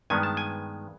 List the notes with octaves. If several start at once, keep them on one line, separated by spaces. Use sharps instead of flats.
G2 D#3 G#3 B3 G#5
A5
G#5